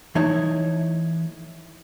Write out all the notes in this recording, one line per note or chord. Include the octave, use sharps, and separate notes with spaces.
E3 A3 D#4 E4 C#5 A5